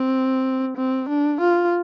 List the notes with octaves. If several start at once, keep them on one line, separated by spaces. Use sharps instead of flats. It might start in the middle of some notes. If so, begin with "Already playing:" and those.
Already playing: C4
C4
D4
F4